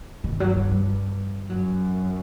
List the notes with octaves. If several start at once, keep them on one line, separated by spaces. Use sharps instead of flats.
G2 D#3
F#3
G3
G3
F#2 F#3